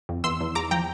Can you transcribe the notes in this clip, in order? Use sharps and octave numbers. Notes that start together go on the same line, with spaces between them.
F2
E2 C6 E6
E2
E2 A#5 D6
F3 G5 A#5